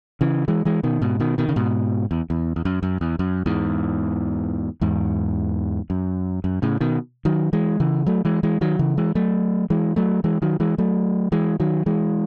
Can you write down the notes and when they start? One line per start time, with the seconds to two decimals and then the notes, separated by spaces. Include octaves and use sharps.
0.21 C#3 E3
0.48 E3 G#3
0.65 E3 G#3
0.83 B2 D#3
1.02 G#2 B2
1.20 B2 D#3
1.38 B2 D#3
1.49 C#3
1.56 G#2 B2
2.11 E2
2.30 E2
2.56 E2
2.65 F#2
2.83 F#2
3.01 E2
3.19 F#2
3.46 E2 G#2
4.81 E2 G#2
5.90 F#2
6.44 F#2
6.62 A2 C#3
6.81 B2 D#3
7.25 D#3 F#3
7.53 E3 G#3
7.80 C#3 E3
8.06 F#3 A3
8.25 E3 G#3
8.43 E3 G#3
8.61 D#3 F#3
8.79 C#3 E3
8.97 E3 G#3
9.15 F#3 A3
9.70 E3 G#3
9.96 F#3 A3
10.24 E3 G#3
10.42 D#3 F#3
10.60 E3 G#3
10.78 F#3 A3
11.32 E3 G#3
11.60 D#3 F#3
11.86 E3 G#3